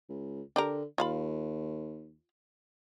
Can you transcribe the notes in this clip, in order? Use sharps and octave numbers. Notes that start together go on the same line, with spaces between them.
C#2
D3 D4 G4 A#4
D#2 F4 F5 B5